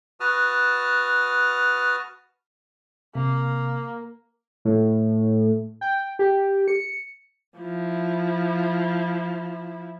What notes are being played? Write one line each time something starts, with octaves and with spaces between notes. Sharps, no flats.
F#4 B4 A5 D#6 F6
C3 A#3
A2
G5
G4
C#7
F3 E4